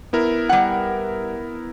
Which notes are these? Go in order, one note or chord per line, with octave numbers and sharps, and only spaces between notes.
B3 E4 A#4
G3 F#5